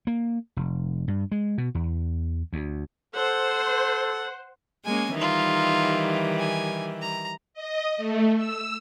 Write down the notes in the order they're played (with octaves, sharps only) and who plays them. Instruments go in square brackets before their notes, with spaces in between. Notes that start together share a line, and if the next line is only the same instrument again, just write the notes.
[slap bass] A#3
F1
G2
G#3
B2
E2
D2
[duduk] A4 [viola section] C5 [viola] F#5
[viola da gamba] G#3 A#3 C#4 [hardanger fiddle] G#5
[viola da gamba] D#3 E3 G3 [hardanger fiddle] D#4 F4
[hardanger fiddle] G#5
A#5
[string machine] D#5
A3
E6